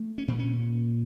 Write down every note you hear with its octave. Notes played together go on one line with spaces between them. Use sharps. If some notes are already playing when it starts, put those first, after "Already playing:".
Already playing: A3
C#4
A#2 C4
C#4